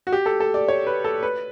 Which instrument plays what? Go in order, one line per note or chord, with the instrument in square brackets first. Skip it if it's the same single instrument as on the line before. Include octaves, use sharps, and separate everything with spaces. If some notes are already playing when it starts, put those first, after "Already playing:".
[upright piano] F#4
G4
A4
A4
D5
C#5
B4
A4
B4